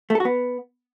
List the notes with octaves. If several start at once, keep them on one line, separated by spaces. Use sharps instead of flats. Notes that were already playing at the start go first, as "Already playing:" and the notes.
A3
A4
F#4
B3